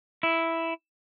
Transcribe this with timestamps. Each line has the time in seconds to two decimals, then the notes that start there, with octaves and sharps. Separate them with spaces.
0.23 E4